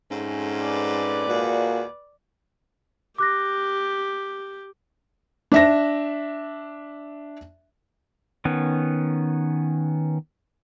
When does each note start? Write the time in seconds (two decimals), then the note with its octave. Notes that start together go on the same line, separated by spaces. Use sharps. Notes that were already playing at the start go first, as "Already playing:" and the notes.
0.11 F2 G#2 A3 C#4
0.61 B4 D5
1.28 D#2 A#2 G#3 F#4
3.18 G4 D6 F#6 A#6
5.52 D4 E5 A#6
8.45 D#3 B3 C#4